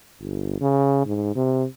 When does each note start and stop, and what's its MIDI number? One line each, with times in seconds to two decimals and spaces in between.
0.21 0.59 31
0.61 1.05 49
1.06 1.32 44
1.36 1.64 48